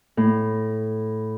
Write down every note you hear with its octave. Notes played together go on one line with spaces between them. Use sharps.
A2